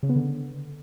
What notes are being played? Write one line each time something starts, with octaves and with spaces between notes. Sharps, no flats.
C#3
B3
D3